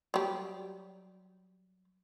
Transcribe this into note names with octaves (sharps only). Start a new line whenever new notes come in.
F#3 G3